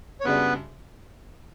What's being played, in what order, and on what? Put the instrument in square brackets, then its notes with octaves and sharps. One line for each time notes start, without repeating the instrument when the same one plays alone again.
[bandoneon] C#5
[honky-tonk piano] F#2 C#3 G3 D4 [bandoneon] B3 B4